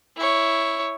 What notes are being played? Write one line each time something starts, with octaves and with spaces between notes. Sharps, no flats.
E4 C#5